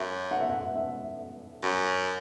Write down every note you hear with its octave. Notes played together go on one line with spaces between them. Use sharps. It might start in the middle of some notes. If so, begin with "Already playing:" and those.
Already playing: F#2 E5
F#5
E5
F#5
E5
F#2